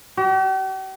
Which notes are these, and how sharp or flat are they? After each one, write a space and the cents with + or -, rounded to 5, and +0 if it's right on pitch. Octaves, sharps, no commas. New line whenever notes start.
G4 -45